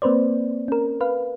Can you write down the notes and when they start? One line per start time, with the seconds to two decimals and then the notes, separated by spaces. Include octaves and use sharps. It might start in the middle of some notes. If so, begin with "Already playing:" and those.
0.02 A#3 C4 B4 C5 D5
0.68 C#4 A#4
1.01 B4 F5